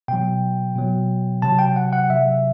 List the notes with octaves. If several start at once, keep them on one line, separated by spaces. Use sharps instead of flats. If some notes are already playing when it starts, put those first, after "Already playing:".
B2 F#3 G5
B2 F#3
C3 F#3 A5
G5
F#5
F#5
C3 F#3 E5